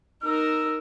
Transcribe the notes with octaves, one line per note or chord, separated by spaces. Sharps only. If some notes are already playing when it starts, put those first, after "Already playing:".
D#4 A#4 E6